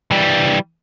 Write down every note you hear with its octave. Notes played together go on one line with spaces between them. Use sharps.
E3 G3